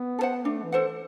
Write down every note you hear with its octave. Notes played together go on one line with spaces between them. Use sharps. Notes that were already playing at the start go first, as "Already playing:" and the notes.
Already playing: B3
A4
C5 F#5
A3 D4
E3
A4 C5 F#5